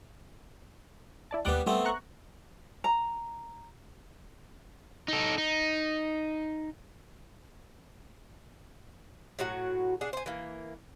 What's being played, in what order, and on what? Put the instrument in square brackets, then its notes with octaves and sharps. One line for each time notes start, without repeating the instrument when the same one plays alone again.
[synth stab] E4 D5 A5
[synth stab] D#2 D6 F#6 [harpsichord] G3 B3
[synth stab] G3 [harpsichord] A3 B3 C4
[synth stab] A#5 C#6 F#6
[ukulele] A#5
[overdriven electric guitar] D#4 A4
D#4
[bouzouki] A2 F#3 F#4 F#5
D4 G#4 F#5
C5 G#5
E3 A#3